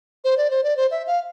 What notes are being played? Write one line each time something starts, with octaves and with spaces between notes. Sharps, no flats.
C5
D5
C5
D5
C5
E5
F5